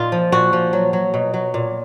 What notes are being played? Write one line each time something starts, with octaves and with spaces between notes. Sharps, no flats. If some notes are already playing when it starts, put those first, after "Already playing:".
Already playing: A#2 D#4 F4
F3
A#2 F#4
F3
F#3
F#3
B2
F#3
A#2